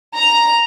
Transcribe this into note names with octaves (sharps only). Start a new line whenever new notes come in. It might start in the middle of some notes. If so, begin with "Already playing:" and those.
A#5